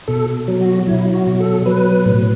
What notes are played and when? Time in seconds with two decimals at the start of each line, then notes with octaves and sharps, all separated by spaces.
0.08 B2 A4
0.48 F#3
0.61 F#4
0.87 F#3 E4
1.14 F#4
1.27 B2
1.40 A4
1.66 F#3 B4
2.06 A2